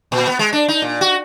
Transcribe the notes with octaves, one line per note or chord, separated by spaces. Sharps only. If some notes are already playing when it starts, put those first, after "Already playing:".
A#2
B3
G#3
D4
D#4
A#2
F#4